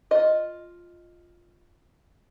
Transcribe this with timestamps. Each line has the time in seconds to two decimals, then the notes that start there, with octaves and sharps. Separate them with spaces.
0.11 F4 D#5